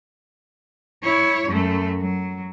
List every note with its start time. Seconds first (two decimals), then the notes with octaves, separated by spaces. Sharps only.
1.03 E4 C#5
1.50 F#2 A3
1.99 F#3